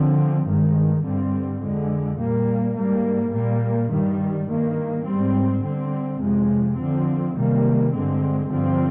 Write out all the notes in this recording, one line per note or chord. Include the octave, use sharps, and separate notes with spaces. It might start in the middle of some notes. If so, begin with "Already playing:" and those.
Already playing: D3 F3 C4
G2 D#3 G#3
G2 D3 G3 C4
F2 D3 G#3
A#2 G3 A#3
G#2 G3 A#3
A#2 G3 A#3
G2 D#3 G3
G2 D#3 A#3
G#2 G3 C4
D3 G3 C4
F2 C3 F3 G#3
D3 F3 C4
C3 D#3 G3 A#3
G2 D3 G#3 C4
G2 D3 F3 C4